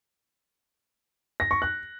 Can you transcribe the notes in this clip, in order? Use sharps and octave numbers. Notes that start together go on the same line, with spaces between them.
A#6
C#6
F#6